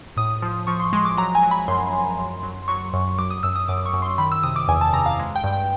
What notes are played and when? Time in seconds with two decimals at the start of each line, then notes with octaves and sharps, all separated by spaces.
0.17 A2 D#6
0.42 F3
0.67 F3 C#6
0.80 C6
0.93 G#3 C6
1.05 D6
1.18 F#3 A#5
1.35 G#5
1.43 F#3
1.51 B5
1.68 F#2 C6
1.92 F#2
2.18 F#2
2.43 F#3
2.68 F#3 C#6
2.93 F#2
3.19 F#3 D6
3.31 D#6
3.43 F#2 E6
3.56 D#6
3.68 F#2 D6
3.86 C#6
3.93 F#2
4.02 C6
4.18 D#3 B5
4.32 E6
4.43 C3 D#6
4.56 D6
4.68 E2 G#5
4.81 A5
4.93 C3 A#5
5.06 F5
5.19 G#3
5.36 G5
5.44 G2
5.52 G5